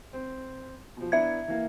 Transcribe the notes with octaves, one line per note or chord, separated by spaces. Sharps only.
C4
B2 F3
B3 D4 E4 E5 G#6
E3 A#3